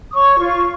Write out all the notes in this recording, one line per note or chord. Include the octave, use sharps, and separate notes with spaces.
D#6
C#5 C#6
F4